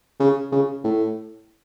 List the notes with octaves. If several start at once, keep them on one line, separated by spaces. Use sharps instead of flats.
C#3
C#3
A2